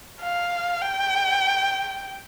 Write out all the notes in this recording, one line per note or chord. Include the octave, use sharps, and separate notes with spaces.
F5
G5